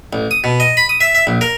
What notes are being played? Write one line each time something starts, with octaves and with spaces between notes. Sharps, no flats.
A1
D#6
B2
D#5
B5
D#6
E5
E5
A#1
A#4